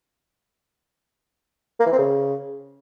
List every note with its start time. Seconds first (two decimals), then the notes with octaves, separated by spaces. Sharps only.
1.80 A#3
1.86 E3
1.92 C4
1.99 C#3